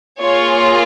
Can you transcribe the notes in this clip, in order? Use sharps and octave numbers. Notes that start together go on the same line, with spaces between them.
A#3 F4 G#4 C#5